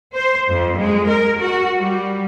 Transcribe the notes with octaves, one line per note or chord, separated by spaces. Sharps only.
C5
F2
G#3
A#4
F#4
G3